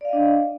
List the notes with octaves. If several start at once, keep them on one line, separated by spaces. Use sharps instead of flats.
D4 D5 D#5 F5